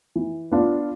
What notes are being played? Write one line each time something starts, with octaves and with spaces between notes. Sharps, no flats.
E3
B3 D4 F4